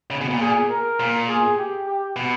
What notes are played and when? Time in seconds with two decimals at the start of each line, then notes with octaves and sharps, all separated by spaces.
0.11 C#3
0.21 B2
0.31 A#2
0.41 G#4
0.70 A#4
1.00 A#2
1.29 G#4
1.58 G4
1.87 G4
2.16 B2